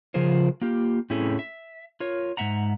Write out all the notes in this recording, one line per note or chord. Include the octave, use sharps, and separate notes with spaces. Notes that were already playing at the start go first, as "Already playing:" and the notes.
C#3 F3 F4 G#4 A#4 C5
A#3 F4 G4
A2 C4 C#4 E4 G#4 A4
E5
F4 A#4 C#5
G#2 C4 E5 F#5 A#5